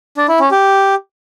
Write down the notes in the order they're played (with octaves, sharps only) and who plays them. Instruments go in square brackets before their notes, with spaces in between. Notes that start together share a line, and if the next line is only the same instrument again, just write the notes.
[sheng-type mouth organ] D4
E4
C#4
G4